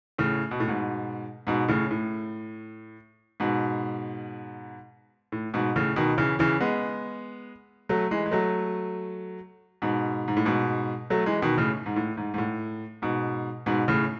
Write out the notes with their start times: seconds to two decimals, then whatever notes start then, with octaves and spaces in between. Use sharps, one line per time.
0.18 A2 C#3
0.51 B2
0.60 A2
0.67 G#2 B2
1.47 G#2 B2
1.68 A2 C#3
1.91 A2
3.40 G#2 B2
5.32 A2
5.54 G#2 B2
5.76 A2 C#3
5.96 B2 D#3
6.18 C#3 E3
6.39 C#3 E3
6.61 G#3 B3
7.89 F#3 A3
8.11 E3 G#3
8.26 G#3
8.31 F#3 A3
9.82 G#2 B2
10.28 G#2
10.37 A2
10.45 G#2 B2
11.10 F#3 A3
11.26 E3 G#3
11.42 B2 D#3
11.58 A2 C#3
11.86 G#2
11.96 A2
12.17 G#2
12.34 G#2
12.38 A2
13.02 G#2 B2
13.66 G#2 B2
13.88 A2 C#3